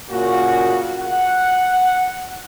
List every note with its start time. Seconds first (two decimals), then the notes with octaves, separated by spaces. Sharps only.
0.10 A#2 C#3 A#3 F#4
0.99 F#5